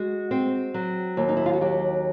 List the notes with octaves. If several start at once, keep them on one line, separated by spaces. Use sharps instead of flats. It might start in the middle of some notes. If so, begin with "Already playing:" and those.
Already playing: G#3 F#4
C4
F#3
D#2
D#4
E4
F4
F#4
F#3 G4